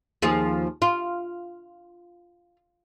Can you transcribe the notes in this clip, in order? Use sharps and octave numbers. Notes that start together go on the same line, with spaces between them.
D#2 F3 G#4
F4